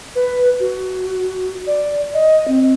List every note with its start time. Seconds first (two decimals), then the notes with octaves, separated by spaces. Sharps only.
0.15 B4
0.60 F#4
1.67 D5
2.14 D#5
2.48 C4